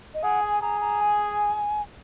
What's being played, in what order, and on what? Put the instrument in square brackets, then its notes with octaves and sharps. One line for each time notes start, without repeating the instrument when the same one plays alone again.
[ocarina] D#5
[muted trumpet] G#4 [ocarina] F#5
[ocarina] G#5
[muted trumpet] G#4 [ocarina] A#5
[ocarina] A#5
G#5